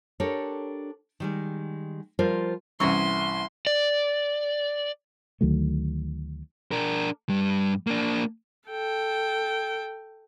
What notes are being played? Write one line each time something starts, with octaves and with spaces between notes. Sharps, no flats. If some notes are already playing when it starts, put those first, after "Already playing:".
D4 G4 A4 A#4 C#5
D#3 G3 G#3
F3 G3 F4 A#4 C5 D5
C2 E3 G3 B3 C#4 E4 C6 C#6
D5
D2 D#3 F#3 A3
D4 A#4
G2 G3
A#3 D4
A4 G5